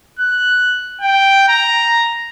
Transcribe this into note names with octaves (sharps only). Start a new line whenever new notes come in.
F#6
G5
A#5